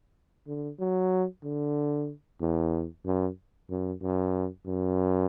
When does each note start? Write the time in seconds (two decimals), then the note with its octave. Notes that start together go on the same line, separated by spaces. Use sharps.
0.47 D3
0.80 F#3
1.44 D3
2.41 E2
3.05 F#2
3.70 F#2
4.02 F#2
4.66 F#2